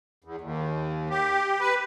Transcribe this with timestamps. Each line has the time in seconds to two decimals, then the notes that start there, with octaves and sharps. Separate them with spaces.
0.24 E2
0.41 D#2
1.10 G4
1.60 B4